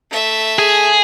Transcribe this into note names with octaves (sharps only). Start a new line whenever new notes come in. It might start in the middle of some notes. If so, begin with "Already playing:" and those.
A3 E5
G#4